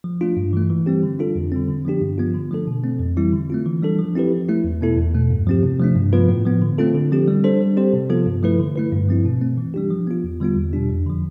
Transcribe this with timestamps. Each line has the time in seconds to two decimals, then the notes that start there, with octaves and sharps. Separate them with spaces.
0.04 F3
0.21 A3 D4 F4
0.37 G2
0.53 E3 A3
0.70 E3
0.86 G3 C4 G4
1.03 D3
1.19 G3 D4 F4 A4
1.36 F2
1.52 D3 G3 C4
1.69 D3
1.85 F3 B3 D4 G4
2.01 G2
2.18 F3 B3 F4
2.34 D3
2.51 F3 A3 D4 A4
2.67 B2
2.84 A3 C4
3.00 F2
3.17 E3 G3 C4 E4
3.33 D3
3.50 A3 C4 F4
3.66 E3
3.82 G3 D4 A4
3.99 F3
4.15 C4 E4 G4 B4
4.32 F3
4.49 A3 E4
4.64 E2
4.81 B2 B3 E4 A4
4.98 E2
5.14 B2 A3
5.30 G2
5.47 F3 C4 G4
5.63 C3
5.80 F3 A3 D4
5.96 G2
6.13 F3 B3 F4 B4
6.29 A2
6.46 F3 B3
6.62 D3
6.78 A3 C4 F4 A4
6.95 D3
7.12 F3 C4 G4
7.28 G3
7.44 D4 A4 C5
7.60 G3
7.77 C4 G4 C5
7.93 C3
8.10 F3 B3 F4 A4
8.26 G2
8.43 F3 A3 E4 B4
8.59 D3
8.76 A3 E4 B4
8.92 G2
9.09 F3 C4 E4
9.25 B2
9.41 A3 C4
9.58 E3
9.74 G3 D4 G4
9.91 F3
10.07 B3 F4
10.24 E2
10.40 D3 G3 B3 F4
10.57 E2
10.73 B2 G3 D4 G4
10.90 F2
11.06 D3 F3